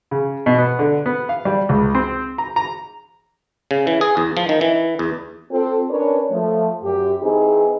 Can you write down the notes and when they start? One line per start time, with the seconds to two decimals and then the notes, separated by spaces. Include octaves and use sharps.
0.11 C#3
0.46 B2
0.58 B3
0.79 D3
1.06 B3
1.29 F5
1.45 G3
1.69 C#2
1.95 C4
2.38 A#5
2.56 A#5
3.71 C#3
3.87 E3
4.01 G#4
4.17 E2
4.37 F3
4.49 D#3
4.61 E3
4.99 E2
5.51 C4 F4 A4
5.90 C#4 D4 A#4 B4 C#5
6.31 F3 A3
6.83 F#2 G4
7.22 E3 C4 D#4 G#4